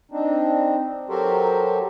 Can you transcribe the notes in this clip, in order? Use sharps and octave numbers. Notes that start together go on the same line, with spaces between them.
C4 D4 D#4
F#3 F#4 G4 A4 A#4 C5